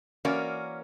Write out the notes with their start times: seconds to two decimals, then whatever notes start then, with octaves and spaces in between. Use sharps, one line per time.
0.25 E3 A#3 C#4 F#4 A#4 D5